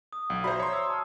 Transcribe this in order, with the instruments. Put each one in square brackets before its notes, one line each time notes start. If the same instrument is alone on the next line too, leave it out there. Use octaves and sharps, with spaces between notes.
[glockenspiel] D#6
[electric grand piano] B1 [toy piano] F#5
[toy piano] F#4 D5 E5 [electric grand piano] C5 A#5 B5
[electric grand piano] C#5 C6 [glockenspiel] A#5
[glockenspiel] E6
[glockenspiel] A5 F6 [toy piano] D#6